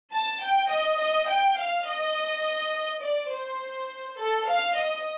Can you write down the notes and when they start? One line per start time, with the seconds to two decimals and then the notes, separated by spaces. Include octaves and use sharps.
0.13 A5
0.42 G5
0.71 D#5
1.00 D#5
1.29 G5
1.58 F5
1.87 D#5
3.03 D5
3.31 C5
4.19 A4
4.48 F5
4.77 D#5